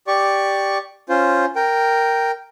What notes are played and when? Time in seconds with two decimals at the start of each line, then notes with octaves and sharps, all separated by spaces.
0.07 G4 D5 C#6
1.09 C#4 F4 C5
1.56 A#4 G5